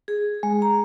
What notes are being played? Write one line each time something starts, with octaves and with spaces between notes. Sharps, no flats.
G#4
G#3
A#5